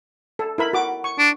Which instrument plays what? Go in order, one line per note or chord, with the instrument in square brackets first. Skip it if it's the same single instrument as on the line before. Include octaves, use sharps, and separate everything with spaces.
[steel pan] A4
E4 A#4 B5
F#4 D6
C#6
[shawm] D4